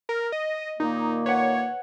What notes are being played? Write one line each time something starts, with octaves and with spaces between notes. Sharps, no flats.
A#4
D#5
A#2 D#3 A#3 D#4
B4 C#5 F#5